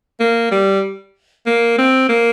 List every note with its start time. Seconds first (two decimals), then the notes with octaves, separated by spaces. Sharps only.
0.20 A#3
0.51 G3
1.46 A#3
1.78 C4
2.09 A#3